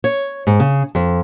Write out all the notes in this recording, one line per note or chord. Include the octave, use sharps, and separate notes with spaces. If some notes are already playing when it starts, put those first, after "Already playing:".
C#5
G#2
C#3
F2